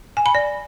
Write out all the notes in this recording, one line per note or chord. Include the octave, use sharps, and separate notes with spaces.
G#5
B5
D5